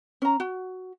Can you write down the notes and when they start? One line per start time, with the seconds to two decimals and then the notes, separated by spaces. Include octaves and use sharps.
0.22 C#4 A#5
0.40 F#4